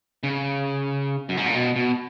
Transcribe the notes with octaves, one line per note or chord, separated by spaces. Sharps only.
C#3
F#2
G#2
A#2
B2
B2